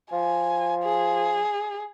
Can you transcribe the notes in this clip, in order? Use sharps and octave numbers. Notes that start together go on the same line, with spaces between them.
F3 G#5
G#4